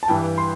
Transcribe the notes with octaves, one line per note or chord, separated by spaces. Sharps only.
A5
G2 E3 G3 G5
C6